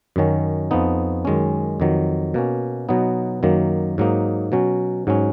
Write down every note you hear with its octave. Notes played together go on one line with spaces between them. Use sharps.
F#2 D#3 F#3 C#4
F2 F3 B3 D#4
F#2 D#3 G#3 C#4
F2 D#3 F#3
B2 A#3 C#4
B2 F#3 B3 D#4
F#2 D#3 F#3 A#3
G#2 F#3 A#3 D#4
B2 F#3 C#4
G#2 F#3 C#4